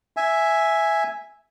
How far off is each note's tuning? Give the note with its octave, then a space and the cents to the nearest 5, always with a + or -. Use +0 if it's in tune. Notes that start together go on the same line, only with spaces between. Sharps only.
E5 +0 G#5 +0